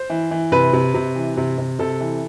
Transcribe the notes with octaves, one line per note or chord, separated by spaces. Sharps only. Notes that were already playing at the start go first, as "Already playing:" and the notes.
Already playing: C5
E3
E3
C3 B4
C3
C3
E3
C3
C3
C3 A4
E3